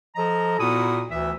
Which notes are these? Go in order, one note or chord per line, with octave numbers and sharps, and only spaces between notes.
F3 A4 D#5 A#5
A#2 B3 E4 F#4 D#6
D2 E3 E5